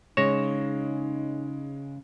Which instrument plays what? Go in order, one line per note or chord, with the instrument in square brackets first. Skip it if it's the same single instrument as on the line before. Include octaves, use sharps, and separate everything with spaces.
[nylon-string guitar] C#3 [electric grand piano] G#3 A#6 E7 [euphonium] D#4 [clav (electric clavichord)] C#5